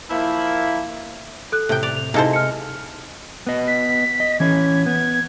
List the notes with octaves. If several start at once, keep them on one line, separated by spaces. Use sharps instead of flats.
F3 A#3 E4
A4 F#6
A2 C3 G5
D5 F7
F7
C3 G#3 A#3 D#4 E4 A4 C5
F6 C#7
B3 D#5
B6
D#5
E3 C#4 C#5 G#6
B3 G#6